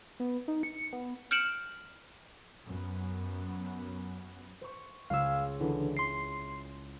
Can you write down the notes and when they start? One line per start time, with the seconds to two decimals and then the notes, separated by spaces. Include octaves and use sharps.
0.20 B3
0.48 D#4
0.63 C#7
0.93 B3
1.31 F6 G6 C#7 D7 E7 F#7
2.66 F#2 B3
4.61 C5 C#6
5.10 C#2 G#4 F5 E6
5.60 D3 E3 E4
5.97 C6 C7